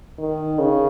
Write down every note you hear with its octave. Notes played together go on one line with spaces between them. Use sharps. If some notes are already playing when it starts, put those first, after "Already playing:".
D#3
C#3